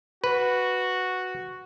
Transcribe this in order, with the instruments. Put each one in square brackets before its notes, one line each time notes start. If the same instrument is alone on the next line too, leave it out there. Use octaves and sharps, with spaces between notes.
[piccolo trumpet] F#4 [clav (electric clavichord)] B4